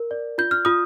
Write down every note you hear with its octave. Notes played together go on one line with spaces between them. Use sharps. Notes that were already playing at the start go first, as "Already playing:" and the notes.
Already playing: A#4
D5
F4 G6
F6
F4 D#6